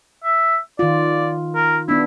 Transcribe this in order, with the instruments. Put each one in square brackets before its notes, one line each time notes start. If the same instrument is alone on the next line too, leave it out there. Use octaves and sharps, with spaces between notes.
[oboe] E5
[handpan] D#3 F4 [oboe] D5
[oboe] A#4
[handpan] B3 D4 [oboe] E4